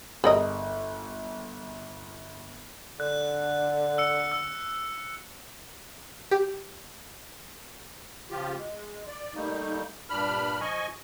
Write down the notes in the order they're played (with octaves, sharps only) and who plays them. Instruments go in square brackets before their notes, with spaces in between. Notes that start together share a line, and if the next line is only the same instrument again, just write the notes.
[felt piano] G1 [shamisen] G#4 A#4 D#5
[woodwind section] D3 [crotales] F#6
[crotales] E6 C#7
E6
[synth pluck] G4
[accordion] C#3 F3 F4 G4
G#3
D5
G3 A3 A#3 D#4
G2 A#2 D4 B5 F6
F3 D#5 G#5 C#6